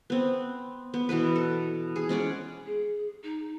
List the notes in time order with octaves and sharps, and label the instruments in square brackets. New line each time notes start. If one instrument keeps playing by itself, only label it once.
[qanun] B3 C4
B3
B2 E3 B3 B4
A4
G#4
G#3 C#4 D5 F#5
[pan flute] G#4
D#4